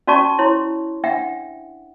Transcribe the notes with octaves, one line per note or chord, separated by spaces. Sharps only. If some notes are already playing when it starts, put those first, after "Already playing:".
C#4 F#4 D5 A5 C#6
E4 C#5 C6
D4 E5 F#5 G5